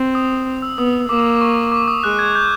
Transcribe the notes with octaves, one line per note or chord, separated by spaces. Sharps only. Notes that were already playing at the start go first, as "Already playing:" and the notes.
Already playing: C4
D#6
E6
B3 D#6
A#3 D6
D6
D6
C#6
D6
D#6
G#3 F#6
G#6
G6